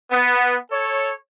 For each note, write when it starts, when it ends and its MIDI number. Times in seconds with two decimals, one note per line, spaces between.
0.12 0.55 59
0.71 1.13 69
0.71 1.13 73